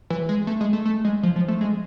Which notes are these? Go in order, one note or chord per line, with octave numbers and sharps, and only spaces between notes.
E3
G#3
A3
G#3
A3
A3
G#3
F3
F3
A3
G#3